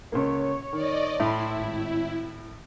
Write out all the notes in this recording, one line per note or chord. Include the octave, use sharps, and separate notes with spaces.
C#2 A#3 C#5
D#3 D5 D#5
A2 E4 B5 C6
G#1